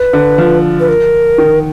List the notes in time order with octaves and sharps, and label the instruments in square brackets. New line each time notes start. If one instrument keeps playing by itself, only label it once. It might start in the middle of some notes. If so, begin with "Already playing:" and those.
Already playing: [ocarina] B4
[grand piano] D3
F3
[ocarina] B4
A#4
[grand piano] D#3